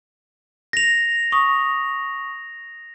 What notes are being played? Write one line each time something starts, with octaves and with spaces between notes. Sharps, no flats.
A#6 F7
C#6 D#6